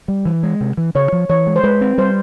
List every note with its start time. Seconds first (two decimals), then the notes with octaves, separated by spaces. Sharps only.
0.08 G3
0.25 E3
0.43 G#3
0.61 C3
0.77 E3
0.95 C#3 C#5
1.12 F3
1.29 E3 C#5
1.47 G#3
1.56 C5
1.63 G#3 B4
1.81 C4
1.98 G3 C5